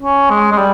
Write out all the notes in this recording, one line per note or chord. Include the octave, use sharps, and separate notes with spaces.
C#4
G#3
G#3
G3